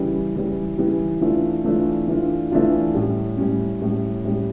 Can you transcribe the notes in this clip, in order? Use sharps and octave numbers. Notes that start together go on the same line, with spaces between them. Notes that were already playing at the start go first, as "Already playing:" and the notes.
Already playing: C#3 E3 G3
C#3 E3 G3
C#3 E3 G3
E3 A3 D4 F4
E3 A3 D4 F4
E3 A3 D4 F4
E3 A3 D4 F4
A2 G3 C#4
A2 G3 C#4
A2 G3 C#4
A2 G3 C#4